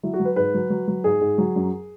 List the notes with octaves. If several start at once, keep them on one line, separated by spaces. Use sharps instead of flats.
F#3 E4
F#4
F#3
B4
G#2 B4
F#3
F#3
F#3
G#2 G#4
G#2
F#3
F#2